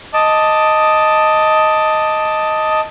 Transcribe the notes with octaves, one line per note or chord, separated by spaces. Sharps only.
D#5 A5 D6